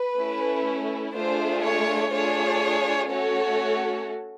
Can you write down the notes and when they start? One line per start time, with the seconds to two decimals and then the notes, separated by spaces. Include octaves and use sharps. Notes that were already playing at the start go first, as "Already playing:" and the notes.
Already playing: B4
0.17 A3 C#4 E4
1.15 A3 D4 F4 G#4 C5
1.64 C#5
2.13 A3 D4 F4 G#4 C#5
3.12 A3 C#4 F#4 A4 C#5